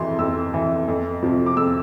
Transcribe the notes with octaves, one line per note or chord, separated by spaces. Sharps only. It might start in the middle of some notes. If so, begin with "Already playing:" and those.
Already playing: F2 E3 C6
F2 E6
E3
F2
C3 F3
D6
F2 E6